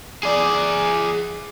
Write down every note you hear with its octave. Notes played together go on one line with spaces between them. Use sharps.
G#4 D5